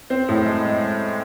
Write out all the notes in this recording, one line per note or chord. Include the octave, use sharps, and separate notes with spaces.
C4
A2
G#3